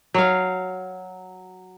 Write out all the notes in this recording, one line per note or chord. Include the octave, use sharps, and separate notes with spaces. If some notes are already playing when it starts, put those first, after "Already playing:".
F#3 C#5 F5